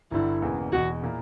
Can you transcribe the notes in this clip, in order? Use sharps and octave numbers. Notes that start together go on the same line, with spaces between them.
G1 G2 D3 E4
E1 E2 C#3 E3 A#3
E1 E2 B2 F#4
A#2 A#3 E4